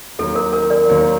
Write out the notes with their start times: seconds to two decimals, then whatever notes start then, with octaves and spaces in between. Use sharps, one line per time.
0.19 D#2 D#3 F#3 A4
0.35 A#4
0.53 A#4
0.70 A#4 D5
0.88 D#2 D#3 F#3